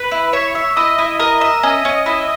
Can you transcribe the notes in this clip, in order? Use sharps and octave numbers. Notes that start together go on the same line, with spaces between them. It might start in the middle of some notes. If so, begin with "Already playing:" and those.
Already playing: B4
E4
C#5 E5
E5
E4 D#5
E4
A#4 D#5
E5
C#4 D#5
C#4
E4